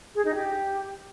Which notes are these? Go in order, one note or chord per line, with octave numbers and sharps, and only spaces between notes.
G#4
D#4
G4